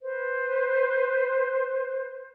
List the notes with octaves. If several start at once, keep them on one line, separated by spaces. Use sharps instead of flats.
B4 C5